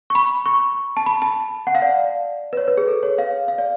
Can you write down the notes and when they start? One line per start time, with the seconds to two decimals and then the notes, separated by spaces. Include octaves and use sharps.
0.10 C#6
0.15 B5
0.46 C#6
0.97 A5
1.06 B5
1.22 A5
1.67 F#5
1.75 F5
1.82 D5
2.53 B4
2.57 C#5
2.68 B4
2.77 G#4
2.88 A4
3.03 C#5
3.18 F5
3.48 F5
3.58 D5